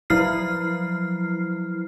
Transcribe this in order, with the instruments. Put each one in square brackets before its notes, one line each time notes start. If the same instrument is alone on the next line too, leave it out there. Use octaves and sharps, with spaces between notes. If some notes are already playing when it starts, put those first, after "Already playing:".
[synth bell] F3 F#3 E4 F6 C7